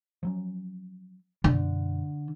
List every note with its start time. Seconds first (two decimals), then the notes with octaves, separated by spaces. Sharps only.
0.23 F3 F#3 C#4
1.44 F#2 B2 D3